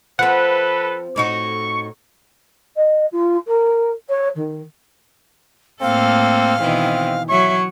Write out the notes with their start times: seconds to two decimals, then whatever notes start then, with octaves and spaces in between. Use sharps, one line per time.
0.19 F3 C4 A4 B4 F#5
1.16 A2 D#4 F#4 C#6
2.75 D#5
3.11 F4
3.47 A#4
4.08 C#5
4.35 D#3
5.81 A2 A#3 C4 A4 F5
6.61 B2 D#3 E3 C4
7.30 F#3 C#5 E5 C#6